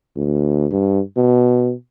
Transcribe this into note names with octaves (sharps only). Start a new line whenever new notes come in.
D2
G2
B2